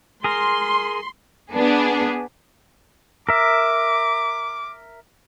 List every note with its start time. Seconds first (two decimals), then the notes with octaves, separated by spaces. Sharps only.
0.24 G#4 A#4 C6
1.53 B3 D4 G#4
3.29 A#4 E5 D6